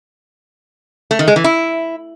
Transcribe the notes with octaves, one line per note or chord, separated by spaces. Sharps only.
A3
D#3
G#3
E3
E4